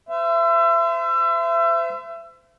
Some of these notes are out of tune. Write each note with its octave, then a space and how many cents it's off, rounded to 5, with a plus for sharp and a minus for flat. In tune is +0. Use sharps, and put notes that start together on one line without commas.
C5 -35 E5 +30